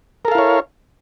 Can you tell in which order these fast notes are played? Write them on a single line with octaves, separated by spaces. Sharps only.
A#4 A4 F5 E4 C#5